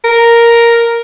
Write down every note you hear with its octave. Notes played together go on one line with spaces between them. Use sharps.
A#4